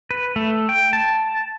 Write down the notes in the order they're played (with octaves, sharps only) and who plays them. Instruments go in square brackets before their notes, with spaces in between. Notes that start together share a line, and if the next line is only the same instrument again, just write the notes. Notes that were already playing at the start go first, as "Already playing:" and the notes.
[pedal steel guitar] B4
A3
G5
A5